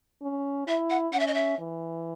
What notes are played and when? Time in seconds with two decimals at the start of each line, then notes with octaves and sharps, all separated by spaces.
0.22 C#4
0.67 E4 E5
0.90 F#5
1.13 C#4 F#5
1.19 E5
1.27 D#5
1.34 E5
1.58 E3